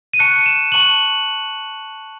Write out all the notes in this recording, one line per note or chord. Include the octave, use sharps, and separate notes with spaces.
D#7
A5 C#6 F#6 C#7
D#7
E7
A5 C#6 F#6 F#7